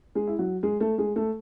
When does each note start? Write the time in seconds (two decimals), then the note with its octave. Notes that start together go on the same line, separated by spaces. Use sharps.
0.15 G#3 G#4
0.27 E4
0.39 F#3 F#4
0.63 G#3 G#4
0.80 A3 A4
0.98 G#3 G#4
1.16 A3 A4